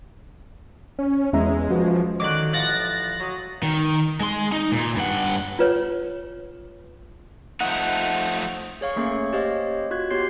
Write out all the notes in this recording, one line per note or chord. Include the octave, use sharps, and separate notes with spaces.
C#4
E2 G#3 C#4 E5 A#5
F3 F#4 B4
D3 D#3 F#3 D6 F#6
A1 F3 F#5 F#6 A6 A#6
F#3 D#6
D#3
G#3 C6
D#4
A#2
G2 F#5
F4 B4 C#5
F3 A3 D#4 F#5
G#4 C#5 F5 C#6
A3 A#3 C#4 G#4 C#5 C#6
G4 C5 C#5 D#5 F5
F4 F#4 F#6 G#6
B3 G4 C#5 C6 G6 C7